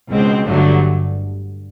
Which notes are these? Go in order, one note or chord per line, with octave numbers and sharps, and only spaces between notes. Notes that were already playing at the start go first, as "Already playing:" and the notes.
C#2 B2 G#3 C4
G1 G2 D3 F#3 A3